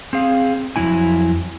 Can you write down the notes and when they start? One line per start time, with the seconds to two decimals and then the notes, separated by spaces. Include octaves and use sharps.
0.13 C4 G#4 F5
0.76 F2 F#3 G3 E4 G#5